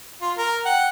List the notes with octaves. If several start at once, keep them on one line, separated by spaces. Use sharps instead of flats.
F4
A#4
F#5 G5